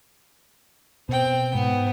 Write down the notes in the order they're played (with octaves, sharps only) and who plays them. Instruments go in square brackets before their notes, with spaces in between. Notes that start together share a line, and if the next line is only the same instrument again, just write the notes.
[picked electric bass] B2 [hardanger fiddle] C4 G5
[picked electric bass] G#2 [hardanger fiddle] B3